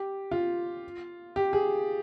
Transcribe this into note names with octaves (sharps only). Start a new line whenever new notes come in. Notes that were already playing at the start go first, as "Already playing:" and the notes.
Already playing: G4
F4
G4
G#4